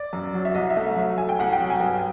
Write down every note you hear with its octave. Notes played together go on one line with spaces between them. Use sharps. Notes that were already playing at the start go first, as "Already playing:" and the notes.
Already playing: D5
F#2
F#3
E5
C2 D#5
E5
A3
E5
F#3
A3 G#5
G5
C2 F#5
G5
F#3
G#5
G2 G5